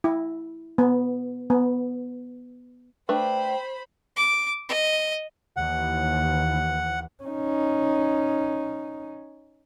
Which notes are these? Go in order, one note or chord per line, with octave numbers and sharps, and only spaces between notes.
E4
B3
B3
A3 D4 B4 C5 G5 B5
D6
D#5
D#2 E3 F#5
C#4 D#4